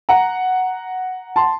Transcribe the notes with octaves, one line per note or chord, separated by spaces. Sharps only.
F#5 A#5
A5 C6